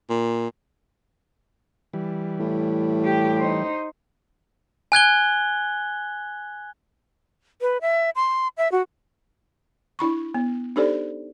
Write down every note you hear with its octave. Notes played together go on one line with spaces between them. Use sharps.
A#2
E3 G3
A2
G4
D#4 C5
G#5 F#6 G#6 G7
B4
E5
C6
E5
F#4
D4 E4 B5 C#6
B3
D4 D#4 G4 A4 C5 D5